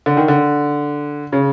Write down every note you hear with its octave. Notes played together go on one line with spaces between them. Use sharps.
D3
D#3
D3
C#3